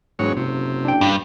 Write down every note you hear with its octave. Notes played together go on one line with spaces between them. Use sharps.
E1 G#2 F#3 C#5
F#1 C3
D4 G5
G2